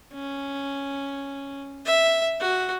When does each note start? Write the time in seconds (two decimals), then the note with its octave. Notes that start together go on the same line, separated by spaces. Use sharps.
0.14 C#4
1.85 E5
2.40 F#4